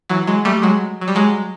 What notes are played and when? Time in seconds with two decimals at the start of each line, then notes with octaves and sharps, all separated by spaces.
0.09 E3 F#3
0.27 F#3 G#3
0.45 G3 A3
0.62 F#3 G#3
1.01 F#3
1.08 G3
1.15 F#3 G#3